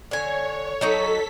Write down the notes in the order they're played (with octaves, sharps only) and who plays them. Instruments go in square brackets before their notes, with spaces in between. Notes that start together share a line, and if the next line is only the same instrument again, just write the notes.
[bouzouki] D3 G#5 [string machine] C#5
[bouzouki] F#3 D#4 F#4 [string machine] A4 B6